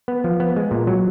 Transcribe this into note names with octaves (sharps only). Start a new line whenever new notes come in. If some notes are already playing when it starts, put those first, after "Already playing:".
B3
F3
B3
G#3
A#2
F#3